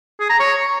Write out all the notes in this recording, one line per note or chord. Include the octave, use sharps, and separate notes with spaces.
G#4
A#5
C#5